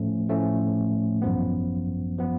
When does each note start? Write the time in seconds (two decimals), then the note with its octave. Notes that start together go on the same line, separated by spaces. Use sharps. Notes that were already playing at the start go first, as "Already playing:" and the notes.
Already playing: A2 F3 A3 C#4
0.28 A2 F3 A3 C#4
1.22 G#1 F#2 F3 B3
2.18 F3 B3